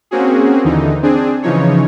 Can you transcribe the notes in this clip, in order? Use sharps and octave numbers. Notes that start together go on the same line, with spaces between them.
A#3 C4 C#4 F#4 G#4
D#2 D3 E3 D#4
C4 D4 G#4
C#3 E3 F3 D#4 C#5